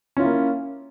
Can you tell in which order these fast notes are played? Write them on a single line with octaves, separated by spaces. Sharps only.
C#4 F4 E4 A#3